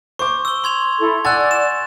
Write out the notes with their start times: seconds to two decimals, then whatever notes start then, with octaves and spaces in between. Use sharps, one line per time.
0.19 C5 C#6 D6
0.45 E6 G7
0.64 C6 G#6 F7
1.00 E4 A4
1.25 D5 F#5 G#5 E6 F#6 A6
1.51 E7